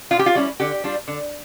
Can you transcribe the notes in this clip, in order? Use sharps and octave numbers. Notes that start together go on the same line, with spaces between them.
A#2 F4
G4
F4
G3 C#4 E4
D3 G4
G3 D4 F4
D3